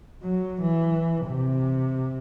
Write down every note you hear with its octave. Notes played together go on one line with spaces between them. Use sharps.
F#3
E3
C3